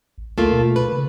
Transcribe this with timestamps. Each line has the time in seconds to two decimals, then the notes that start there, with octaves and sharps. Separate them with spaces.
0.18 A1
0.38 D2 A3 A#3 F4
0.52 B2
0.76 B4
0.92 C#3